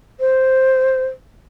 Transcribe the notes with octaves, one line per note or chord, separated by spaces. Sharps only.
C5